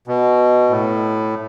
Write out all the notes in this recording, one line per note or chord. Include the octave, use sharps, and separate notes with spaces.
B2
A2